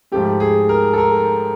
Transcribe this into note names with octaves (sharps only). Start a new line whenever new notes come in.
G#2 F3 A3 G4
G#4
A#4
A4
A#4